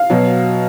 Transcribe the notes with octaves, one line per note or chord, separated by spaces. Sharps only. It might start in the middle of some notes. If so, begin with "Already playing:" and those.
Already playing: F5
B2 F#3